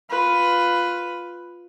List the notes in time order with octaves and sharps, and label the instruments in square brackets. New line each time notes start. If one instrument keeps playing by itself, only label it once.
[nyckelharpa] F4 B4